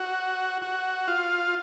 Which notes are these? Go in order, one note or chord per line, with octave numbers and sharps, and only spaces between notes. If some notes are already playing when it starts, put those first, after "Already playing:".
Already playing: F#4
F#4
F4